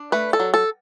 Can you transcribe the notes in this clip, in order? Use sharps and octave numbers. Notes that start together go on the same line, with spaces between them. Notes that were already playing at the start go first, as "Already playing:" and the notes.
Already playing: D4
A3 B4
A4
F#3
A4